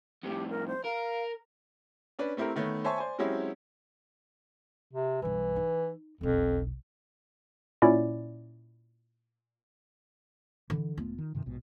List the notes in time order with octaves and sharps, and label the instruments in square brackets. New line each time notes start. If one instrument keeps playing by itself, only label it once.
[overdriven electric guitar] F2 A2 [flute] G4
[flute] A#4
C5
[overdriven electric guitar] A#4 [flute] F5
[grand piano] C#4 D4 B4
A3 C4 E4 G4 A#4
D#3 A3 B3 C#5
C5 C#5 E5 G#5 A5 C#6
C5 D5 G#5
F#3 G#3 C4 C#4 E4 G4
[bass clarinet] C3
[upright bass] B1 G2 [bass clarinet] E3
[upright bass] D#4
[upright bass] E1 B1 [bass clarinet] F2
[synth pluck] A#2 C#4 E4 D5
[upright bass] D3 [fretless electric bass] E3
[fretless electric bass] E1 A3 B3 [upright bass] F4
[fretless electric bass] D#3
G2 C3 D#3
A#1 G#2 B2